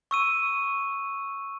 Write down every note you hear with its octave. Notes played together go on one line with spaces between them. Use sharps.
C#6 E6 D#7